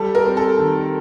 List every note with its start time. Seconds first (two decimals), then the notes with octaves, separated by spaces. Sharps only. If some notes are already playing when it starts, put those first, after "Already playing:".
Already playing: G3 A4
0.15 A#4
0.26 C4
0.37 A4
0.59 D#3